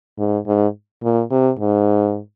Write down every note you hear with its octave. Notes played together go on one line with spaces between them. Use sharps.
G#2
G#2
A#2
C3
G#2